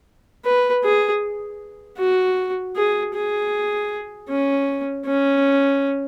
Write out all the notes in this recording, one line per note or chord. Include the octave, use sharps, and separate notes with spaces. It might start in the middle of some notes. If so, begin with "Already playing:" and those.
B4
G#4
F#4
G#4
G#4
C#4
C#4